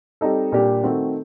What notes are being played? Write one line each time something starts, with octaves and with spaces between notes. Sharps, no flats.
G3 C4 D#4 A4
A#2 G3 D4 G4
D#3 A3 C4 F#4